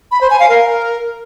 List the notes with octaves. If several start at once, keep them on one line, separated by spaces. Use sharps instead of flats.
B5
C5
G#5
F5
A#4